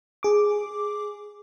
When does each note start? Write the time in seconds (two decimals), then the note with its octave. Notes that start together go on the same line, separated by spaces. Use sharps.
0.23 G#4 D6